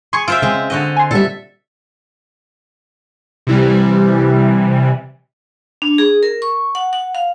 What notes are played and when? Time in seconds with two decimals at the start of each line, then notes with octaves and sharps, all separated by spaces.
0.13 G#4 C6 C#6 G#6
0.28 F4 C5 E5 E6 D7
0.42 C#3 G#3 C4
0.70 D3 F#4 D#5
0.96 G#5 C6
1.11 A#2 D3 G3 A4 E5
3.47 C3 E3 G3
5.82 D4
5.98 G#4
6.23 A#4
6.42 C#6
6.75 F#5
6.93 F#5
7.15 F5